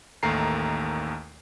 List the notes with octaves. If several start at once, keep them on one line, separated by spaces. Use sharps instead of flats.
A1 D#2 D#3 A3 A#5 C7